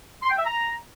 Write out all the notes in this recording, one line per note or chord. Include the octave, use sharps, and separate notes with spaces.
C6
G5
E5
A#5